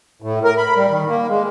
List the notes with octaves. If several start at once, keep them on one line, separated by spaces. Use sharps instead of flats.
A2
A#4
B5
G3
D#3
A#3
G#3